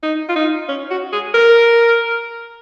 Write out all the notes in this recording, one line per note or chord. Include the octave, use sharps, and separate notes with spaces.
D#4
F4
D#4
C#4
F#4
G#4
A#4